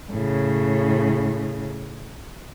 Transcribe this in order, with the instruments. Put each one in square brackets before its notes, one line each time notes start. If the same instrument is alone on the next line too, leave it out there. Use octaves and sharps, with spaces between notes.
[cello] A2 C#3